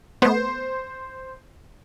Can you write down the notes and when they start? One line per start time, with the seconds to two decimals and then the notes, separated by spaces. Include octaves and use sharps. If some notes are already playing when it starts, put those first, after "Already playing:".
0.22 A3 B3 C5